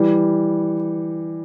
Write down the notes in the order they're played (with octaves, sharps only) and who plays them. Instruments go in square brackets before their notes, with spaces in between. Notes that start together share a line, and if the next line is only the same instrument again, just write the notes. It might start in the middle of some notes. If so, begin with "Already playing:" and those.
Already playing: [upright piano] E3 G3